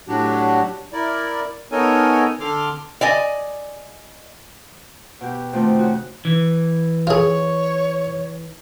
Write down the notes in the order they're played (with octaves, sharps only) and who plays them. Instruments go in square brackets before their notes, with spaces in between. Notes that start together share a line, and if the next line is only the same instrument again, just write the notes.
[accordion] A2 F#3 D4 F#4 G4
E4 A#4 D5
B3 D#4 A4 A#4 C#5 G#5
D3 A4 C6 D6 F6
[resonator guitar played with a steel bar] D5 D#5 G#5
[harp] B2 G4
F2 C3 D#3 A3
C#3 F#4
[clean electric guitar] E3
[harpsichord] F4 G#4 [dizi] C#5